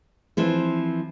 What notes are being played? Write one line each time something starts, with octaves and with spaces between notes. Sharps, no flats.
E3 F3 C4 E4